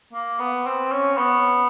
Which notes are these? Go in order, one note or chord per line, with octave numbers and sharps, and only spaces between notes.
A#3
B3
C4
C#4
B3